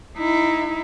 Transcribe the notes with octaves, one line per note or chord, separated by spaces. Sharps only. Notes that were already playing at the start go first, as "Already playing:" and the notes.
D#4 E4